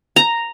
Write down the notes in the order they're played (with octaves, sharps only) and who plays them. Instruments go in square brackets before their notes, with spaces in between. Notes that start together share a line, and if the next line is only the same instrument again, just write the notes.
[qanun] A#5